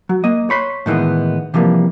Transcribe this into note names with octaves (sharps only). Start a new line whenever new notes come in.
F#3
A#3 D#5
C#5 B5 C6
A2 D#3 E3 G#3 B3
C3 E3 F3 G3 A#3